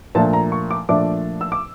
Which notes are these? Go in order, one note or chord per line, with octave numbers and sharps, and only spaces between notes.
A#2 F3 A3 D4 A5
A#5
C#6
D6
A#2 F3 A3 D4 D6
E6
D6